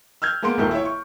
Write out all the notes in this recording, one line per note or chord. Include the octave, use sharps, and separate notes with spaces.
E6 F6 G6 G#6
G#3 A#3 B3 C6 D7
D#1 G#2 A3 A#4 G6
E4 C#5
C#6